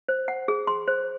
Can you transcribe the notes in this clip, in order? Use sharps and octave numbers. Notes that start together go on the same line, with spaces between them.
C5
F#5
G#4
C6
C5